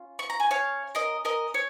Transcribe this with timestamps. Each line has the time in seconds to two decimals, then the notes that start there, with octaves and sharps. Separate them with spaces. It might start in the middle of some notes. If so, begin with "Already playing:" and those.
Already playing: C#4 F4
0.19 C#6
0.30 A#5
0.40 G#5
0.51 C#5 F5
0.95 A#4 D#5
1.25 A#4 D#5
1.54 C#5